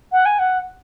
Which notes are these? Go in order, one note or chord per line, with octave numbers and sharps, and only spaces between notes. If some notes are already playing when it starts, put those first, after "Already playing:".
F#5
G#5
F#5